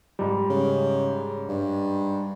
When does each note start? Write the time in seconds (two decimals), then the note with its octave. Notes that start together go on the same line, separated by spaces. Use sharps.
0.19 G#2 G3
0.50 C#3
1.49 G2